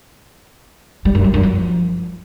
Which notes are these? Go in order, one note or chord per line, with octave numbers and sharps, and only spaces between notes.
G3
F#2
G3
F#2
F3